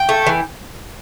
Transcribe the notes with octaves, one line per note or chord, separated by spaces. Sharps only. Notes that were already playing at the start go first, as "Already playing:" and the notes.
Already playing: G5
A3
E3